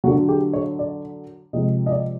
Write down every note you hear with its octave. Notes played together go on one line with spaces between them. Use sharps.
D3 F#3 F#4
G4
C#5
D5
C3 F3 G#3 D#5
D#5
D5